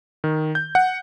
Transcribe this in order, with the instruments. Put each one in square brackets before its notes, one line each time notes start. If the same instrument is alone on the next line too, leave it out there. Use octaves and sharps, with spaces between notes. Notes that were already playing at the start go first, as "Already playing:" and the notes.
[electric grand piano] D#3
G6
F#5